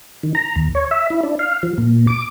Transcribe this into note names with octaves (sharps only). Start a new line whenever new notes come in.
D#3
A#5
D#2
C#5
E5
E4
D4
F5
F3
A#2
D6